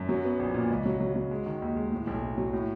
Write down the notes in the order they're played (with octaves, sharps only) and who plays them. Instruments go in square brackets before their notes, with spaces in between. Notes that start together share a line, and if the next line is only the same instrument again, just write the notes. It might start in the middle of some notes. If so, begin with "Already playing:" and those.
Already playing: [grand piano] F#2
F#3
B3
A#1
A#2
C#2
F#3
F#3
F#3
G#3
D#3
D#2
G#3
A2
B1
A2
F#3
A2